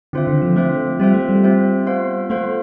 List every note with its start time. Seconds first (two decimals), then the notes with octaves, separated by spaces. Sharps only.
0.13 D3 C4 F4 C5 E5
0.27 D3
0.42 F3
0.56 A3 C4 F4 C5 E5
0.99 G3 C4 F4 C5 E5
1.14 A3
1.29 G3
1.44 C4 F4 C5 E5
1.86 B3 F4 C5 F5
2.29 A3 B3 F4 C5 F5